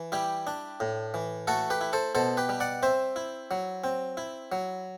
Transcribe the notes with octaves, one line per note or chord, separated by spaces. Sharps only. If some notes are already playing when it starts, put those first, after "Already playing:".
Already playing: E3
G3 E4 G4
D4
A2
E3
A3 F#4 A4
G4 B4
E4
A4 C5
B2 A4 C5
G4 B4
G3
D5 F#5
C4 C5 E5
E4
F#3
C4
E4
F#3